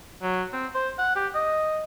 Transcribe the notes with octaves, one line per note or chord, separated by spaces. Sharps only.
F#3
C4
C5
F#5
G4
D#5